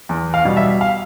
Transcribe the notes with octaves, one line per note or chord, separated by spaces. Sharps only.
E2
F5
B2 G3
E5
F5